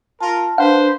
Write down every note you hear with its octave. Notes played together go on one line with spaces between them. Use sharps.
F4 A#4 A5
D4 B4 C5 F5 F#5